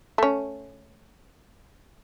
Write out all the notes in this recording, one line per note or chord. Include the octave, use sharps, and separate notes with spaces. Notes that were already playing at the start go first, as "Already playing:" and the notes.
A3 C#4